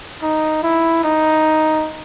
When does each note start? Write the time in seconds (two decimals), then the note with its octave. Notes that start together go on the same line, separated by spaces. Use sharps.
0.22 D#4
0.63 E4
1.03 D#4